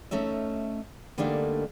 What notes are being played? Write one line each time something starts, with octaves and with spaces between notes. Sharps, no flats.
A3 C#4 D#4 E5
D3 G3 A3 A#3 D4 D#4